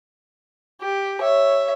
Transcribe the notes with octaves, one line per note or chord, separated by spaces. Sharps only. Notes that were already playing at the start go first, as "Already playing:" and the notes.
G4
C#5 E5